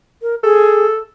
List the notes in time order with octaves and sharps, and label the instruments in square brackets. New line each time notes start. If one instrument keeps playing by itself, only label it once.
[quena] A#4
[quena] G#4 [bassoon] A4